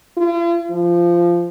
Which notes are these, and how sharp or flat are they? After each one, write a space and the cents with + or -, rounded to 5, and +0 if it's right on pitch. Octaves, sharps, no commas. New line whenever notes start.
F4 -45
F3 -15